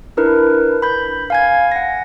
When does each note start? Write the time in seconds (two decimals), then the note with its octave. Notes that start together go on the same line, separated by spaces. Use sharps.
0.17 D4 E4 A#4 B4
0.82 B5 G6
1.30 F5 G#5 G#6
1.72 F#5 A#6